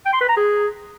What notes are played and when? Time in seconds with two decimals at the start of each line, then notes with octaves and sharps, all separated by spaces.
0.05 G5
0.13 C6
0.21 B4
0.29 A#5
0.37 G#4